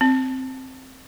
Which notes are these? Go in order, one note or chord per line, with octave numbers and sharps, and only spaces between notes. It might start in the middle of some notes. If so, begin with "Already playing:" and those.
C4